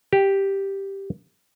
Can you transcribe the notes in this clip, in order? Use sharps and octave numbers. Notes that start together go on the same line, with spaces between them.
G4